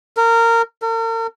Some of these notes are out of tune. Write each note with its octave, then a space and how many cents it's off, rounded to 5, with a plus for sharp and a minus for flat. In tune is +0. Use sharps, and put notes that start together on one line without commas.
A#4 -20
A#4 -45